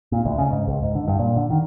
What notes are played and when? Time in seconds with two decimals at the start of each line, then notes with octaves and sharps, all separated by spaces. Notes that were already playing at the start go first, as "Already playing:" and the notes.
0.12 A#2
0.25 D2
0.38 C#3
0.51 G#2
0.68 C#2
0.83 G#2
0.95 D3
1.08 G2
1.19 A#2
1.37 D3
1.50 D#3